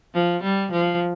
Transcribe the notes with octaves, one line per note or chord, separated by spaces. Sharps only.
F3
G3
F3